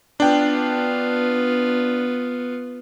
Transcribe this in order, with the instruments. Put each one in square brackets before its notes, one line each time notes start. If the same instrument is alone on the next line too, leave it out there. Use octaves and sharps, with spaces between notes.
[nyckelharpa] B3 F4 [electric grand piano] D4 G5